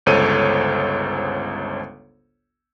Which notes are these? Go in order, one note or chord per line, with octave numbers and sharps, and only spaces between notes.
G1 C#2 A4 C5 C#5 D#7